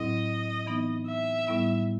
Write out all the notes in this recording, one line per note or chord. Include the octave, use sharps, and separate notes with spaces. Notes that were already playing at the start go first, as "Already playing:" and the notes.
Already playing: A2 F#3 C4 E4 D#5
E3 B3 D#4
E5
A2 G3 B3 E4